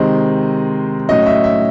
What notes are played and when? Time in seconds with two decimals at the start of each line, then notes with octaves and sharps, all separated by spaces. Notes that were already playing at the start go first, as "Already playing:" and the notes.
Already playing: C3 D#3 G#3 C4 D#5
1.09 A2 F#3 C#4 D#5
1.26 E5
1.44 E5